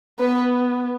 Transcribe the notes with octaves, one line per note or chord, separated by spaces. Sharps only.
B3 B4